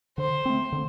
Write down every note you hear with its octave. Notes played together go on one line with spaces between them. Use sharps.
D3 C5
A3 C4
D3